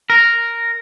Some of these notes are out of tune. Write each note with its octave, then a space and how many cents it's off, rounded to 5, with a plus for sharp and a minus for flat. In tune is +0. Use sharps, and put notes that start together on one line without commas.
A#4 -5